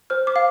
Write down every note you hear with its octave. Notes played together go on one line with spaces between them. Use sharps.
C5 F6
D6
F5